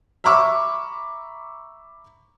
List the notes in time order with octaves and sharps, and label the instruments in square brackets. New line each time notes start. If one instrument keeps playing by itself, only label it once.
[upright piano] E5 A#5 B5 C#6 D6 E6